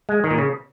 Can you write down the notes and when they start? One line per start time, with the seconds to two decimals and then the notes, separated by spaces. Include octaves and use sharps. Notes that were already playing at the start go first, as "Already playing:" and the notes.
0.09 G#3
0.24 D#3
0.31 A#2
0.38 C#3